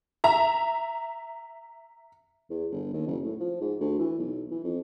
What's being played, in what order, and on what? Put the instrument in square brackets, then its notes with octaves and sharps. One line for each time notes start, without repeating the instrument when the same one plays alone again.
[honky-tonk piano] E5 A#5
[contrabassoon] E2
G1
D#2
F#1
A2
F3
G#2
D2
E3
B1
E3
F2